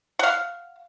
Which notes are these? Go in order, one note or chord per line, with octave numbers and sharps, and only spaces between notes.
F5 F#5